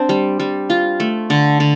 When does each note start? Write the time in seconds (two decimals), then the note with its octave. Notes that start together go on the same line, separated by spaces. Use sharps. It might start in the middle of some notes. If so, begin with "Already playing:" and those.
Already playing: C4 D4
0.09 G3
0.40 G3
0.70 F4
1.00 A3
1.30 D3
1.60 D3